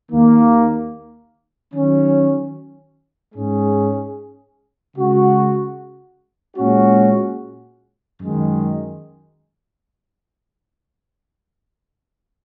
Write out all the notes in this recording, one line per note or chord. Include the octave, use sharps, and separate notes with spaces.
D#2 D#3 A#3
D#3 F#3 C#4
G#2 G#3 C#4 G#4
C#3 G#3 F#4
A#2 G#3 C#4 F#4
F#2 D#3 G#3